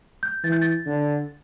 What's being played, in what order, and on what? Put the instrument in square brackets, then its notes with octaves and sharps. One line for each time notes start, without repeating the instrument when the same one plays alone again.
[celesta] G6
[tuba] E3 [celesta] A6
[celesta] G6
A6
[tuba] D3